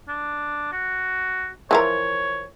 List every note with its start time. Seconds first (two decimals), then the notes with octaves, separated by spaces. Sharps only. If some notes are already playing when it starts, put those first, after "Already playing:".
0.08 D4
0.72 F#4
1.71 E3 F3 A#4 C#5